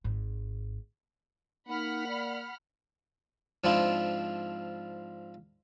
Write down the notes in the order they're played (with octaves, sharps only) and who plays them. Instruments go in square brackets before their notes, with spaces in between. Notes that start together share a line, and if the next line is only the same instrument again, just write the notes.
[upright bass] G#1 G#2
[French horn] A#3 [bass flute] D#4 [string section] F#5 B5 F6
[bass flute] D5
[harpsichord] G#2 F3 C4 D4 E4 F4